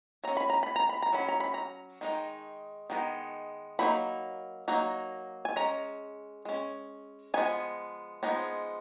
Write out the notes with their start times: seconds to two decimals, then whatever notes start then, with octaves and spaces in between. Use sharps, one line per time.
0.24 F#3 C#4 A#5
0.37 B5
0.50 A#5
0.63 B5
0.76 A#5
0.89 B5
1.02 A#5
1.12 F#3 C#4 B5
1.28 A#5
1.40 B5
1.54 A#5
2.01 D#3 G#3 D#4
2.90 D#3 G#3 B3 D#4
3.79 F#3 A#3 D#4 B5
4.68 F#3 A#3 D#4
5.45 G#5
5.56 G#3 C#4 A#5
6.45 G#3 C#4
7.34 F3 G#3 B3 D#4 G#5
8.23 F3 G#3 B3 D#4